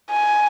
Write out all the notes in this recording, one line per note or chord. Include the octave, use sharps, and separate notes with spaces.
G#5